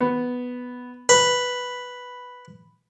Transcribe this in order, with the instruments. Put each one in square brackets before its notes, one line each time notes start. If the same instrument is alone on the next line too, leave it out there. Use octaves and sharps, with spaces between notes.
[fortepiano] B3
[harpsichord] B4 [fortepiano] B5